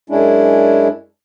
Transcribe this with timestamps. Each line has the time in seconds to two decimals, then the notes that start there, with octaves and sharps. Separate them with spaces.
0.10 F#2 G#3 C#4 D4 E4